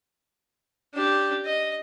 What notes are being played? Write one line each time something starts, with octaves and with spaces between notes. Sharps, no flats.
D4 G4
D#5